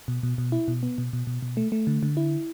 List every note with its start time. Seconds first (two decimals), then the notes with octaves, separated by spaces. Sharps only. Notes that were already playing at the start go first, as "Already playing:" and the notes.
0.08 B2
0.23 B2
0.38 B2
0.52 E4
0.68 B2
0.83 B3
0.98 B2
1.13 B2
1.27 B2
1.42 B2
1.57 A3
1.72 A3
1.87 D3
2.03 D3
2.17 E4